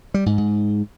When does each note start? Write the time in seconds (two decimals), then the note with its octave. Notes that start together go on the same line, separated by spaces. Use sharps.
0.14 G3
0.26 G#2
0.38 G#2